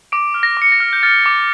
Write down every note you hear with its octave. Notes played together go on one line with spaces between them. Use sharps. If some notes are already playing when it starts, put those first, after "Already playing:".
D6 D7
F6
A#6
D6 C#7
A#6
F6
G6
F6 A6
D6